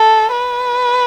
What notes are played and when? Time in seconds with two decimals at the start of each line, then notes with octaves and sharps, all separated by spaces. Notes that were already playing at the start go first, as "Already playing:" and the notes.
Already playing: A4
0.32 B4